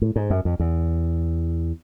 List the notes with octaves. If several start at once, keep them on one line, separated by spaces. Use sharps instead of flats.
A2
G#2
F#2
F2
E2